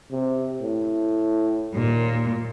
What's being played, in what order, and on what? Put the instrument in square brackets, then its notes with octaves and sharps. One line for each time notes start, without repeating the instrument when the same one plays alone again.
[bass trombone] C3
A2
[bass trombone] D#2 [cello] A#2